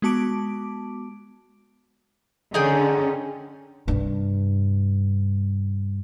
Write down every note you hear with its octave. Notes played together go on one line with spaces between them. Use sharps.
G#3 B3 F#4 A5 D6 D7
D3 C#4 D#4 G#4 G5
G2 C3